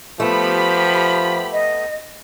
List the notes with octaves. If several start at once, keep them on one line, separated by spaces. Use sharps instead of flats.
F3 A3 B3 G4 B5
D#5